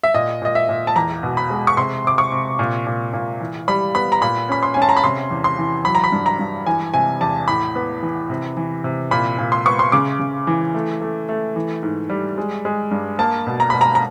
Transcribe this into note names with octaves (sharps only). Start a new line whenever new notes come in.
E5
A#2 D#5
A#2 D#5
E5
A#2
A5
E2 A#5
B2
B5
G#3
C#6
C3 C6
C3 D6
C#6
C3
A#2
A#2
A#2
E3
G3 B5
B3 B5
A#5
A#2 B5
C#4 B5
C6
C#4 G#5
A5
A#5
B5
C3 C6
E2
C6
E3
F#3 B5
A#5
B5
G2
A#5
G2
E3 G#5
C3 G#5
E2 A5
A2 B5
B3
E3
C3
E3
C3
A#2 B5
A#2
C6
B3 C#6
C6
C#3 D6
C#3
E3
A3
A3
A3
E3
G#2
G3
G#3
G#3
G2
A#3 A5
B2
A#5
B2 B5
A#5
A#5